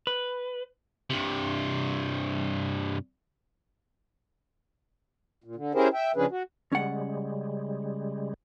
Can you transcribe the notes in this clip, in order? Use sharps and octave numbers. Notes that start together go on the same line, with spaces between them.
B4
G2 C3
A#2
D3
C#4 E4 G4 G#4 A#4 C5
E5 G5
C#3 F3 C#4 D4 G#4 B4
F#4
C#3 G3 G#3 C#4 F#5